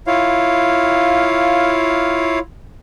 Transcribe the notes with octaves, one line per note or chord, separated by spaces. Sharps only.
E4 F4 C#5 F5